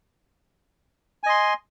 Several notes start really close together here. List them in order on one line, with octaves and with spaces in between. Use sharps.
G#5 D#5 C6